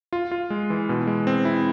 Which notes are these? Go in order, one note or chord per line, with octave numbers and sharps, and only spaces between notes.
F4
F4
G#3
E3
B2
G#3
C4
E4